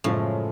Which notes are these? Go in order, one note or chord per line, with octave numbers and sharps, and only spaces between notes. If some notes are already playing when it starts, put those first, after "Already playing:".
F#2 A2 C#3 F3 G#3 C#4